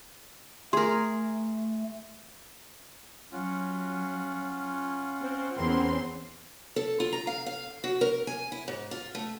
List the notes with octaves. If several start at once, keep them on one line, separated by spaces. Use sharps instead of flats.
A3 G#4 A#4 C6
F#3 C#4 F4 F#5
C4
E2 C4 C#4 A#4 C6
A4
F4
A#5
F5
F5
F#4
A#4
G#5
E4
G#2
F4
A3